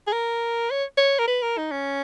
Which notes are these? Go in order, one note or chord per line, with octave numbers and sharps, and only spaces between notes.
G#4
A#4
C#5
C#5
A#4
B4
A#4
D#4
C#4